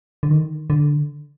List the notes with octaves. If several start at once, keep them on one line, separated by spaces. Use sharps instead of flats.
D3
D#3
D3